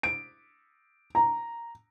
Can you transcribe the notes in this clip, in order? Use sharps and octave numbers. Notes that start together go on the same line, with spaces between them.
D7
A#5